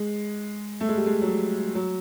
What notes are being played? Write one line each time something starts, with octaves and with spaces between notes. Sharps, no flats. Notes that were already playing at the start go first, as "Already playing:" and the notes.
Already playing: G#3
A3
G#3
G3
G#3
F#3
G3
F#3